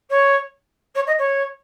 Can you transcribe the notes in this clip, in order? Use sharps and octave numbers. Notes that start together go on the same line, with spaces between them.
C#5
C#5
D#5
C#5